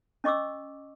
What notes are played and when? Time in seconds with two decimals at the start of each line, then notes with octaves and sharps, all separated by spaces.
0.24 C#4 D#5 C#6 D6 E6